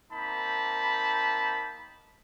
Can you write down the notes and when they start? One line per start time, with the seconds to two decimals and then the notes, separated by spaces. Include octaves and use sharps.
0.12 A#3 C4 D#4 A5 B5